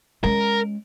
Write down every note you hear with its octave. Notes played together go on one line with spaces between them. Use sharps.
G#3 C#4 A#4